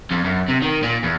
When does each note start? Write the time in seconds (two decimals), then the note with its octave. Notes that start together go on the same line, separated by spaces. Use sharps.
0.11 F2
0.24 F#2
0.48 C3
0.62 D#3
0.83 A#2
1.03 E2